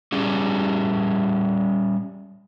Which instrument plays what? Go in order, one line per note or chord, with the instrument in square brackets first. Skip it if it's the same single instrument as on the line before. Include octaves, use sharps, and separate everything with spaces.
[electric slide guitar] G3 C#4 G#4